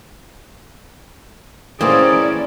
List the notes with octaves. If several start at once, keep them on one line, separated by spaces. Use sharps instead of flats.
E3 A#3 C4 C#4 G#4 D5